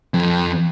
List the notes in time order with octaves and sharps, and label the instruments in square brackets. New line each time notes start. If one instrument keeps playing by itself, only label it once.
[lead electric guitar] F2